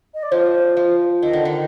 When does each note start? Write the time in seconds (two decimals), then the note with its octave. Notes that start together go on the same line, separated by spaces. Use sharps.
0.14 D#5
0.23 D5
0.31 F3 C5
0.77 F3
1.23 D#3 D#5
1.33 D3
1.45 D#3